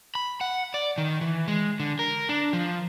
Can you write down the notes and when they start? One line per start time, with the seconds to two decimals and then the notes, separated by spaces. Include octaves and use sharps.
0.15 B5
0.41 F#5
0.74 D5
0.98 D#3
1.21 E3
1.48 G#3
1.80 D3
1.99 A#4
2.29 D4
2.53 F3